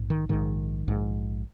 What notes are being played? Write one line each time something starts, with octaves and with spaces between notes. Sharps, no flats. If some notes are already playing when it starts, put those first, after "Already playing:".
Already playing: A#1 G#2
D#3
A#1 G#2 D#3
A#1 G#2